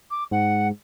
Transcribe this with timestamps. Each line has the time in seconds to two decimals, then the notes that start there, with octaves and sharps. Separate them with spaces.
0.10 D6
0.31 G#2 F#5